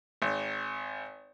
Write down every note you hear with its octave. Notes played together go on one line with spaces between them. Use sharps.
G#1